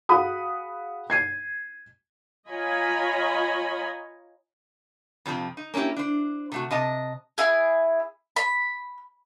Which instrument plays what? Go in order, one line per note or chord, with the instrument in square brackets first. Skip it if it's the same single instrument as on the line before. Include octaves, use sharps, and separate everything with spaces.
[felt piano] F#4 G#4 F5 F#5 B5 D#6
G#6 C7 D#7
[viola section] F4 C#5 D#5 G#5 A#5 B5
[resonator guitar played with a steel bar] F2 C3 F3 C4
D#4
A#3 C#4 D#4 E4 G4
D4 C5
C3 A3 F#4
C3 D#5 A5
[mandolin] E4 G#4
B5